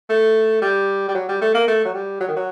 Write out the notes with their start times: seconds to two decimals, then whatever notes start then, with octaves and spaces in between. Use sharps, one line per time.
0.10 A3
0.62 G3
1.08 G3
1.15 F#3
1.29 G3
1.42 A3
1.55 A#3
1.68 A3
1.85 F#3
1.95 G3
2.20 F#3
2.28 D#3
2.36 F#3